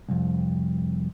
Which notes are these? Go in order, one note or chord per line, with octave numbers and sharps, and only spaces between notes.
C2 F2